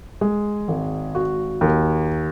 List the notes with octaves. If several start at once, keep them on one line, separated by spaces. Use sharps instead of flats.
G#3
G#1
F#4
D#2